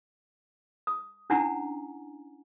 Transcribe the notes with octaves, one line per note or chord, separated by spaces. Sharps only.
D#6
C#4 D4 E4 F#5 G#5 A#5